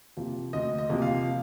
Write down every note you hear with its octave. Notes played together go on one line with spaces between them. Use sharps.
C3 F3 A#3
D2 D#5
D#5
C3 F3 A#3
F5